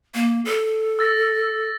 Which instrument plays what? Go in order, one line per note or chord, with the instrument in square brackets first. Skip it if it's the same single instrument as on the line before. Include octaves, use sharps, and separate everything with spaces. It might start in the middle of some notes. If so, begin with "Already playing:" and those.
[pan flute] A#3
A4
[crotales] E6 A6 A#6